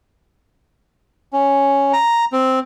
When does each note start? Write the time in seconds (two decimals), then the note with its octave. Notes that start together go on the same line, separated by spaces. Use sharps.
1.33 C#4
1.93 A#5
2.32 C4